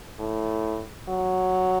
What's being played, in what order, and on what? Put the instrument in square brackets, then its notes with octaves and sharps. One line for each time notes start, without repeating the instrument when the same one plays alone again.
[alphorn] A2
F#3